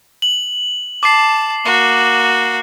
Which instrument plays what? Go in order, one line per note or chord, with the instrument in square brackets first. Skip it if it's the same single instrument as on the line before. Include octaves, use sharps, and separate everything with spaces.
[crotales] F#7
[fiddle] A5 [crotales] D6 C7
[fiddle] A#3 F#4